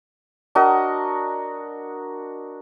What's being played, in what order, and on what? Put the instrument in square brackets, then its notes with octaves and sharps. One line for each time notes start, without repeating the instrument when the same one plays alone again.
[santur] D4 F#4 A#4 D#5